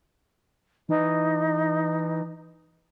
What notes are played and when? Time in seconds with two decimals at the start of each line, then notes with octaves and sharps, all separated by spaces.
0.89 E3 D#4